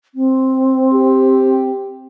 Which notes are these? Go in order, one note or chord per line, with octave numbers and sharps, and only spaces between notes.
C4
G4